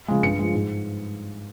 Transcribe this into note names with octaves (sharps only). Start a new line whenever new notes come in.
C#3 F3 G#3
G2 C#7
F3 G#3
G#2